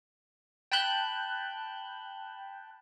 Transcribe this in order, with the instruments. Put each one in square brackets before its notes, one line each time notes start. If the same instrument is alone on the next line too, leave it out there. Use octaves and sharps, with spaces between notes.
[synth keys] G5 A5 B5 F#6 G6